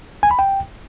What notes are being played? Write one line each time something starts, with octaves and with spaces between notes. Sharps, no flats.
G#5
B5
G5